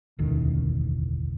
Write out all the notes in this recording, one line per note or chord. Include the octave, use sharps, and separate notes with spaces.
E1 A1 D2 D#3